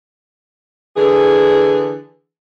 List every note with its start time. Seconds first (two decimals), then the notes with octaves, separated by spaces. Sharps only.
0.96 D3 E3 G#4